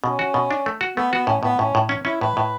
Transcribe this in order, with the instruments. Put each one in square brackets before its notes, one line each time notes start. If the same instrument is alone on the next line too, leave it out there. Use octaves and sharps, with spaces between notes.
[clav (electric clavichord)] B2 [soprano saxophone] C#4
[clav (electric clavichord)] F#4
B2
D4
A3
F#4
[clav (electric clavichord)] A3 [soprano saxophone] B3
[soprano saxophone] B3 [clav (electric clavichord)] F#4
[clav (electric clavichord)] A2 [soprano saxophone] C#4
[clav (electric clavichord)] A2 [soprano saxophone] B3
[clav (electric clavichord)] A2 [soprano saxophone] C#4
[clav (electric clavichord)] A2
C#4
[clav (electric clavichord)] C#4 [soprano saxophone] E4
[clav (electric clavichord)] A2 [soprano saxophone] B4
[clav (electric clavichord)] A2